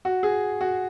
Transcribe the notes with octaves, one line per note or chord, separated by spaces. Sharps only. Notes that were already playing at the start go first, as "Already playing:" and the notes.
F#4
G#4
F#4